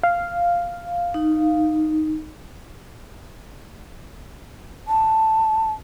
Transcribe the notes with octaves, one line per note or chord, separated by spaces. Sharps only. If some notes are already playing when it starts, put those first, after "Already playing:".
F5
D#4
A5